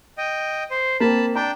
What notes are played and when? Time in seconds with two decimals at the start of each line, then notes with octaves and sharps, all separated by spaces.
0.18 D#5 G5
0.71 C5
1.00 A#3 C4 A5 B5
1.36 D4 G5 A#5